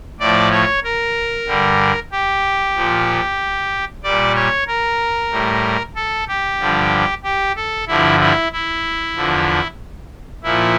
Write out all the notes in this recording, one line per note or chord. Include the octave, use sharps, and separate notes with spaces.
A2 F3 D5
C#5
A#4
G2 D3 G3
G4
A#2 F3
A#2 G3 D5
C#5
A#4
A2 G3
A4
G4
G2 D3 F3
G4
A4
G2 D3 F3 E4
E4
E4
E2 D3 F3
A#2 F3 E4